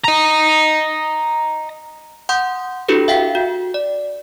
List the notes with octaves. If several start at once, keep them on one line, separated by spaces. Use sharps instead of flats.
D#5 A#5
F#5 C6 D#6 G6
D4 E4 F#4 G4 A4 B4
E5 F5 G5 B6
F#4
D5